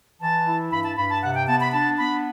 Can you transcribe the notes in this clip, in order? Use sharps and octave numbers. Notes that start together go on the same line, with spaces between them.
E3 A5
E4
G2 B5
A5
G2 B5
A5
C3 F#5
G5
B3 A5
B5
D4 A5
B3 B5